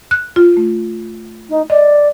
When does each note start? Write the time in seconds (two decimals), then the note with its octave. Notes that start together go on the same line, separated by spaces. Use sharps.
0.11 F#6
0.36 F4
0.57 A3
1.49 D#4
1.70 D5 D#5